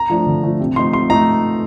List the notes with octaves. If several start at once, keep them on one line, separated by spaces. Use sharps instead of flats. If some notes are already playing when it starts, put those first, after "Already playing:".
Already playing: A#5
F3 A3 D4
D3
F3 A3 D4
C3
F3 A3 D#4 C6
C3 C6
A3 D#4 A#5